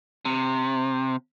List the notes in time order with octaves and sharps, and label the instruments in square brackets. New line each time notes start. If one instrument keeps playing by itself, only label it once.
[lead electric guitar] C3